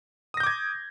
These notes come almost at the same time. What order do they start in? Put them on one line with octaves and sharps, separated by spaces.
D#6 A#6 G6 D6 G#6